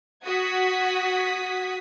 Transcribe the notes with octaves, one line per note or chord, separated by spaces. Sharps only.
F#4 F#5 D#6 G#6 B6